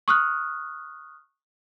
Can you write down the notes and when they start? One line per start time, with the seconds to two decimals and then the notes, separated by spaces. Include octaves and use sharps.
0.08 C#6 D#6 F6 F#6